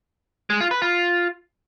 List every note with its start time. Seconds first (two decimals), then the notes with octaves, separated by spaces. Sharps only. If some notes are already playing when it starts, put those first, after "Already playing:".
0.50 G#3
0.60 F4
0.71 B4
0.82 F4